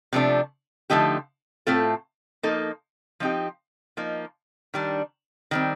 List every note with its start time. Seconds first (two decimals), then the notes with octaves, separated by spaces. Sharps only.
0.13 C3 F3 A3 D4
0.90 D3 F3 A3 D#4 G4
1.67 A2 A3 C4 F4 A4
2.43 F3 A#3 D#4 A4
3.20 F3 C4 D#4 G4
3.97 F3 A#3 D#4
4.74 D#3 G3 D4
5.51 D#3 G3 C4